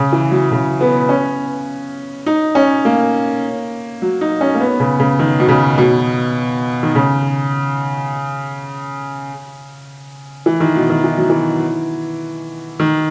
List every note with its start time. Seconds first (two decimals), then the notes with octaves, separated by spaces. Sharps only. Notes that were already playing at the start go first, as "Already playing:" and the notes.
Already playing: C#3
0.13 E3
0.31 F#3
0.52 C#3
0.81 B3
1.09 C#4
2.26 D#4
2.55 C#4
2.85 A#3
4.02 F#3
4.21 D#4
4.41 C#4
4.55 A#3
4.61 B3
4.80 C#3
5.00 C#3
5.19 D#3
5.40 B2
5.49 C#3
5.78 B2
6.83 D#3
6.95 C#3
10.46 E3
10.60 D#3
10.76 B2
10.90 D#3
11.04 E3
11.17 F#3
11.30 E3
12.80 D#3